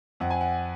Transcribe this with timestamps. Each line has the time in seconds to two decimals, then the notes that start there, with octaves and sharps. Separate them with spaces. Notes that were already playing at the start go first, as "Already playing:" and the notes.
0.20 F2 F#5
0.30 G#5
0.41 F#5